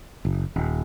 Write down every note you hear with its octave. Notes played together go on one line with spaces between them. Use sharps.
F#1
D#1